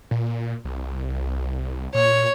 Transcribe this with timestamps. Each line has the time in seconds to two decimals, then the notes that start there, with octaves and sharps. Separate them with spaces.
0.11 A#2
0.65 C2
1.95 A#2 C#5